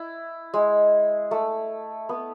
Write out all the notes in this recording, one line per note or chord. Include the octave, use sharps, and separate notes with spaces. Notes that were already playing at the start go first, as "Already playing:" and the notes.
Already playing: E4
G#3
A3
B3